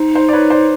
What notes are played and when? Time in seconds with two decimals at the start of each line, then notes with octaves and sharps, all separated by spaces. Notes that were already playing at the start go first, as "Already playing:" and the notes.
Already playing: D#4 C5
0.15 C5
0.29 D5
0.33 B4 C#5
0.50 C5 D5